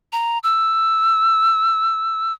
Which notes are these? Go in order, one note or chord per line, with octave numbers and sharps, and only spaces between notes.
A#5
E6